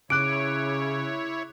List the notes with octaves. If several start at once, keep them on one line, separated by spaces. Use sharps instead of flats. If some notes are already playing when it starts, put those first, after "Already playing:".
C#3 E4 C#5 D6 F#6 D7